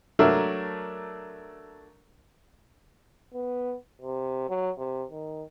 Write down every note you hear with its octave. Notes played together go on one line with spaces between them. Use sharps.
F#3 A3 D4 A#4 E5
B3
C3
F#3
C3
D#3